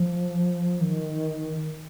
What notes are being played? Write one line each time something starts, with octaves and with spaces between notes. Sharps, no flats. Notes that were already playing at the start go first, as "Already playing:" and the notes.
Already playing: F3
D#3